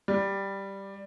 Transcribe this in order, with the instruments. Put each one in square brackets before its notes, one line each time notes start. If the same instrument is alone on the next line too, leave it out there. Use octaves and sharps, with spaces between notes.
[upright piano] G3